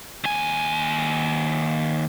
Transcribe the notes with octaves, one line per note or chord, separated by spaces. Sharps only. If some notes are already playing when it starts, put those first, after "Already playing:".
D#2 G#5